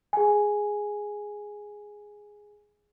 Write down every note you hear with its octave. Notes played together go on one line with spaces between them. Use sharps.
G#4 G#5